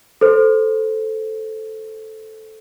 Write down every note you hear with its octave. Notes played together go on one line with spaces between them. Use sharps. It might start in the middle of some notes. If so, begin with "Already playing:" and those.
A4 C5